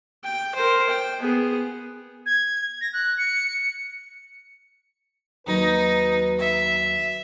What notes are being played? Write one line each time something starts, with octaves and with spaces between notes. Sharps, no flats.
G5
A#4 C5
G5
B3 G#4
G#6
A#6
F#6
C#7
D#2 F#3 D#4 B4
E5